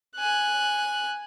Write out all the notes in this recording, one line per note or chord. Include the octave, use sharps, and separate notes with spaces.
G#5 F#6